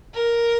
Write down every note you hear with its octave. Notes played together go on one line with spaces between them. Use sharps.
A#4